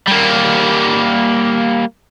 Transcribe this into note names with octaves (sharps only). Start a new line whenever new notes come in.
G3 A#3